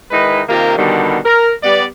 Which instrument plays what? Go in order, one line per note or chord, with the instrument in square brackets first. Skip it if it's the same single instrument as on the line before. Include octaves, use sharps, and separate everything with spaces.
[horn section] D#3 G#3 D#4 E4 B4
C3 D#3 A#3 F4 G4 A#4
B2 D3 D#3 G3
A#4
G3 B3 D5